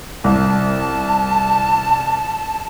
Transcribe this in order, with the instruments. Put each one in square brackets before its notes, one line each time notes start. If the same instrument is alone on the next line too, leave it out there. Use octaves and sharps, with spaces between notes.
[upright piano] C2 [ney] A5